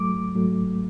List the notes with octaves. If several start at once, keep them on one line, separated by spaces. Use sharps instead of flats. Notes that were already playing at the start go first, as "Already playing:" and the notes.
Already playing: G#2 F#3 A3 D6
G#2 F#3 A3